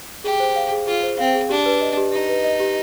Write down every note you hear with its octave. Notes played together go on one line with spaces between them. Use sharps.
G4 G#4
C5
F5
G#4
F4 G#4
C5
C4 F5
G#4
D4 G4
B4
D#5
G4
D#4 G4
B4
D#5
G4